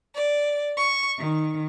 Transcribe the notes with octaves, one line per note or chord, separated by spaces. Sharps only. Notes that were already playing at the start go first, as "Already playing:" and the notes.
D5
C#6
D#3